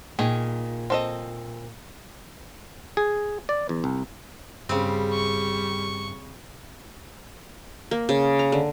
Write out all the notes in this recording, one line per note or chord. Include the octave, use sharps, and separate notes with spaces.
A#2 D#3 G#4
C4 A4 D#5
G#4
D5
E2
C2
G2 C#3 G3 C4
C#6
A#3
C#3
A#5
D3